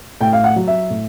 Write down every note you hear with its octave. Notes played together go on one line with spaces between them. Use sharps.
A2 G5
F5
F#5
F#3
E5
A2